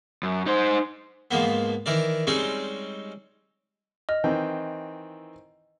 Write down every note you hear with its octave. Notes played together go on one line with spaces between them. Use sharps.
F#2
D#4 C5
G#2 F3 A#3 B3
D#3 E3 A#4 D5
G3 G#3 C4 C#4 D#4
D#5 F6
D#3 E3 C4